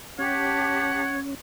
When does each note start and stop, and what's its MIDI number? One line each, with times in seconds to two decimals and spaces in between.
0.19 1.35 61
0.19 1.02 67
0.19 1.20 73
0.19 1.19 78
0.19 1.02 81